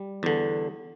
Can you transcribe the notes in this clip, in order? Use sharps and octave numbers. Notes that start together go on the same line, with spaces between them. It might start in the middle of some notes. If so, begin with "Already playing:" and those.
Already playing: G3
E2 D3